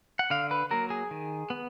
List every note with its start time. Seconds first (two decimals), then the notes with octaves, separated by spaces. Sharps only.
0.19 F#5
0.30 D3 F5
0.51 B4
0.71 F#3 A#3 A#4
0.90 G#4
1.11 D#3
1.50 B3